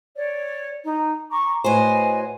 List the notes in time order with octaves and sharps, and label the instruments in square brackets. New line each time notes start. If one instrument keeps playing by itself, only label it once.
[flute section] C#5 D5
D#4
A#5 C#6 D6
[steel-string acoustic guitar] A2 F#4 C5 [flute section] B4 D#5 G#5